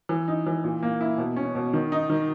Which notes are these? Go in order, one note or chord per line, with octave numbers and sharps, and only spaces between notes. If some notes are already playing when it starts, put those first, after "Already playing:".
E3
D#4
E3
A#2
A#3
E4
B2
C#4
B2
D#3
D#4
D#3